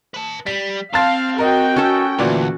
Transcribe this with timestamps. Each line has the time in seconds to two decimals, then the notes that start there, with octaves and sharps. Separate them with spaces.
0.14 B4 A5
0.47 G3 B6
0.94 C4 F5 A5 C6 A6
1.38 F#4 A#4 D#5 G5
1.76 C#4 A4
2.19 D2 A#2 E3 F#4 D5